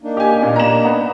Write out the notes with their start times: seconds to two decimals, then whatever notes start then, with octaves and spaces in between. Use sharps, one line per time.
0.02 A#3 D4 D#4
0.17 G4 G#5
0.42 A#2
0.56 A#5 E7
0.85 B3